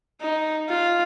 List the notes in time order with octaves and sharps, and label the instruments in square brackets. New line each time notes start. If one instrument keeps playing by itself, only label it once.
[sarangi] D#4
F4